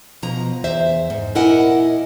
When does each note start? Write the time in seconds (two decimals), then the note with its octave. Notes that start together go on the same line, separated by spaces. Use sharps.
0.23 B2 F3 A#5
0.64 E2 C5 E5
1.10 G#2
1.35 A#2 E4 A#4 D#5 F#5 G#5